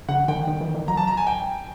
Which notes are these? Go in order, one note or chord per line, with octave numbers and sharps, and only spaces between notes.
D3 F#5
D#3 G5
D#3
E3
D#3
F#3 A#5
A5
A#5
G#5
G5